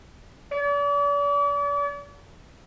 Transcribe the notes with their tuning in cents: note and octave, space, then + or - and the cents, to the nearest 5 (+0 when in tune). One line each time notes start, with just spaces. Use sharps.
D5 -40